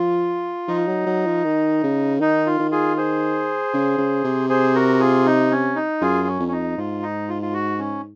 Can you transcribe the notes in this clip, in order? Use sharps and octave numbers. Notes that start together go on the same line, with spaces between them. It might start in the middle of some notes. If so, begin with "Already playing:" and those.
Already playing: F3 F4
F3 D#4
F#3
F#3
F3
D#3
C#3
D#3 D#4
F4
D#3
F4 G#4
G#4 C5
C#3
C#3
C3
G#4 C5
F#4 A#4
F4 G#4
D#4
C#4
D#4
F#2 F4 G#4
C#4
F2
C#4
D#4
G#2 F4
D#4
F4
F4
F#4
C#4